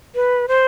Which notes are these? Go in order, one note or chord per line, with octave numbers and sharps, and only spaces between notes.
B4
C5